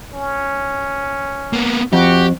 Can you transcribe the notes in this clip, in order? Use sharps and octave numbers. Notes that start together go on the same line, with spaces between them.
C#4
A#3 B3
F2 F#4 G4